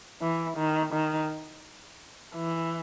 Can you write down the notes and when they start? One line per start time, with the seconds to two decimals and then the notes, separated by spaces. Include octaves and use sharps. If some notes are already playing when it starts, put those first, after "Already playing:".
0.22 E3
0.57 D#3
0.93 D#3
2.36 E3